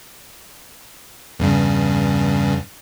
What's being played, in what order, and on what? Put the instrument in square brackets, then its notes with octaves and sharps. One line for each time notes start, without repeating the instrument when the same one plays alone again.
[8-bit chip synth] E2 G2 C#3